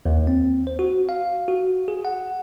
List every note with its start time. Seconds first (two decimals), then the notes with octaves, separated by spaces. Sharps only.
0.06 D#2
0.27 C4
0.67 C5
0.79 F#4
1.09 F5
1.48 F#4
1.88 G#4
2.05 F#5